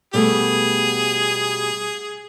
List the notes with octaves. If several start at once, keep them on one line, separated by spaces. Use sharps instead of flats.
B2 G3 A3 G#4